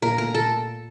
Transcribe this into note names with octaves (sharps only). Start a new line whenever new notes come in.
A#2 A#4
A3 A#4
A#2 A4